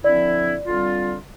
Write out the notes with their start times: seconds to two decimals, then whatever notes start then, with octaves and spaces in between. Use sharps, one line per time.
0.04 D3 F3 C4 E4 D5
0.66 D3 G3 C4 F4